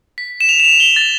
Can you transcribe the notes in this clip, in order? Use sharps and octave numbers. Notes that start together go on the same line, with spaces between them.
B6
E7
F7
E7
F7
G7
A6